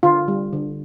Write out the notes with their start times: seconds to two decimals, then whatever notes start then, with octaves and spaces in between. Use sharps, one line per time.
0.03 D3 F4
0.28 G3
0.53 D3